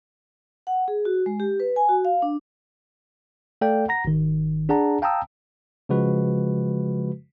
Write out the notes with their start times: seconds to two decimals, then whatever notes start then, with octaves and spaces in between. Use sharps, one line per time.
0.67 F#5
0.88 G#4
1.05 F#4
1.26 G#3
1.40 G4
1.60 B4
1.76 G#5
1.89 F#4
2.05 F5
2.22 D4
3.61 A3 A4 D5 F5 G5
3.88 F#5 A#5 A#6
4.05 G#1 D#3
4.69 D4 G#4 D5 F#5 A5 A#5
5.02 F5 G5 A5 A#5 D#6 E6
5.89 C#3 F3 G#3 F#4 B4